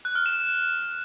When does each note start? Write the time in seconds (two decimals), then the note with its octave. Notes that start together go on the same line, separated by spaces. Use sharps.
0.05 F#6
0.15 F6
0.26 E7